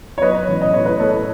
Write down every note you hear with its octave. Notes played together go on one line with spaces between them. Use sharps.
C#5
F#3 B4 D#5
A1
D#5
A2 C#5
B4 D#5
A3 A4 C#5